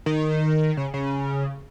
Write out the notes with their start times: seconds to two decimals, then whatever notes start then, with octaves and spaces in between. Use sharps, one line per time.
0.06 D#3
0.77 C#3
0.94 C#3